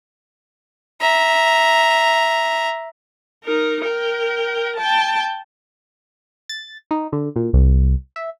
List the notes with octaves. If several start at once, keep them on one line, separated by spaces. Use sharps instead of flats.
E5 A#5
D#4 A#4
A#4 G5
G5 A5
A6
D#4
D3
A#2
C2
E5